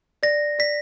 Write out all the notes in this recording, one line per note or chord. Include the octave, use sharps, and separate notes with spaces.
D5 A#6
D5 B6